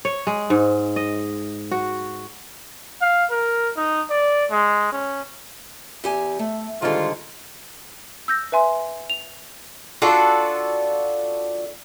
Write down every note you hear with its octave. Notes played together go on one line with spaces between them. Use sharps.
C#5
G#3
G#2
D#5
F#4
F5
A#4
D#4
D5
G#3
C#4
E2 G4 G#5
A3
G#2 D3 D#3 G3 F4
E6 G6 A#6
B4 E5 G#5 C6
F7
D4 F4 F#4 A4